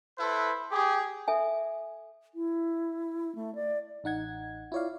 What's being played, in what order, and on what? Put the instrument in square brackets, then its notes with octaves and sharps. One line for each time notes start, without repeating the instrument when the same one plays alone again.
[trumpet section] E4 A4 B4 C5
G4 G#4
[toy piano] A4 E5 G#5
[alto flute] E4
A3
D5
[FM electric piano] A1 D#4 F#5 G#6
E4 F4 C#5 D5 F5